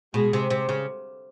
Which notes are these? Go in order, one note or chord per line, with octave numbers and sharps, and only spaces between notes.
B2 G#3 G#4
C3
C3
C#3